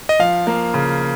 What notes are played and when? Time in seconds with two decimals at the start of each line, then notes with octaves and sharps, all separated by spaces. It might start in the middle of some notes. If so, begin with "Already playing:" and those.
0.09 D#5
0.19 F3 F5
0.47 A#3
0.74 C#3